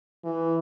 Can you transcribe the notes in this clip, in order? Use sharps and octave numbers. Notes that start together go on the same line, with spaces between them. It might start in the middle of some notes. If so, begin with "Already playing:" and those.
E3